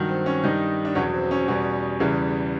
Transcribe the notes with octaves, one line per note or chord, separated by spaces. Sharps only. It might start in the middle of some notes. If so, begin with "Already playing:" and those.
Already playing: G2 D#3 F#3
C4
C#4
G2 D#3 G3 D#4
D4
E2 B2 F#3 C#4
C4
C#4
E2 B2 G3 C#4
E2 C#3 E3 G3